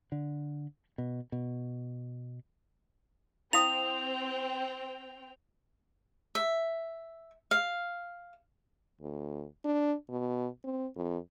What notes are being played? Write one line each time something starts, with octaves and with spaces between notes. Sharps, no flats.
D3
B2
B2
C4 E4 F5 G5 D#6 F7
E5
F5
D2
D4
B2
C4
F2